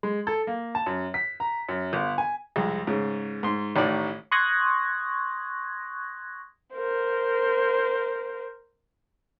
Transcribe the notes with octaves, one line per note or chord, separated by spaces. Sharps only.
G#3
A4
A#3
A5
F#2
B6
A#5
F#2
G1
G#5
C2 F2 G#3
G#2 C#3
G#2 C6
A1 A2 D#3 D5
C6 C#6 D#6 F#6 G#6 A#6
A#4 C5